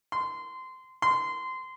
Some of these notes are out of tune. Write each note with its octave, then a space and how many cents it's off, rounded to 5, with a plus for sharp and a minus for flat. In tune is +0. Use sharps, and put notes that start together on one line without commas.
C6 -20
C6 -20